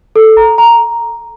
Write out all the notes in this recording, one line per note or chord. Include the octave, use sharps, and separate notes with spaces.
A4
A#5
A#5